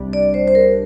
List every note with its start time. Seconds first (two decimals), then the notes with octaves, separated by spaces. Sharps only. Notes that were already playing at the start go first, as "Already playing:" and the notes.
Already playing: C2 C3 G3 D4
0.13 D5
0.34 C5
0.48 C5
0.55 A#4